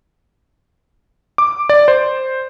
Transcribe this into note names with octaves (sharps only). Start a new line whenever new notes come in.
D6
D5
C5